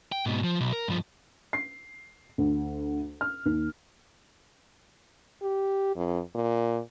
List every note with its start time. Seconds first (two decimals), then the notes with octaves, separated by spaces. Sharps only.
0.12 G5
0.26 G#2 B2
0.44 F3
0.61 B1
0.73 A#4
0.88 G2 F3
1.53 C7
2.38 D2
3.21 F6
3.46 D#2
5.42 G4
5.96 F2
6.35 A#2